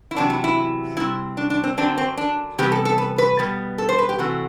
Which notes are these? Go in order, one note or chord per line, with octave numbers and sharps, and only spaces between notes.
E4
E2 C3 F#3 D4
E4
E4
C3 G3 C4 E4
D4
D4
C4
F#2 D3 F#3 C4 D4
C4
D4
E2 C3 G3 B3 G4
A4
A4
B4
B4
B2 G3 B3
A4
C5
B4
G4
C3 E3 A3 C4 F#4